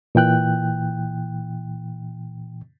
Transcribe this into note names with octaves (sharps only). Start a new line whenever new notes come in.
A#2 E3 G5 F#6